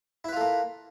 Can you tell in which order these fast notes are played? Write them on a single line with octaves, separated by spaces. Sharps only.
E4 B4 F4 A4 A#3